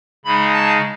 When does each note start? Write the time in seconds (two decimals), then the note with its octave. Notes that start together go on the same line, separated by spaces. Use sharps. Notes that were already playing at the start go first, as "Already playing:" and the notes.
0.25 C#3 G#3 D#4 B5
0.53 A5